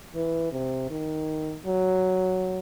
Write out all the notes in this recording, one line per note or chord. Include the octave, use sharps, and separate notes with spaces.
E3
C3
D#3
F#3